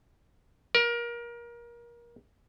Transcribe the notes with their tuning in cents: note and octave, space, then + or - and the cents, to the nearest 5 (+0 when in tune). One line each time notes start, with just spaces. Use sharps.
A#4 +25